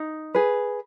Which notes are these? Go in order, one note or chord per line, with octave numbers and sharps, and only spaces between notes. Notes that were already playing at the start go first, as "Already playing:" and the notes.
Already playing: D#4
G#4 B4